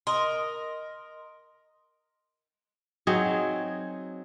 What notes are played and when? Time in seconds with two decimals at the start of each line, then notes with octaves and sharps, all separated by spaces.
0.07 A#4 D#5 C6
3.07 F#3 C4 D#4 G#4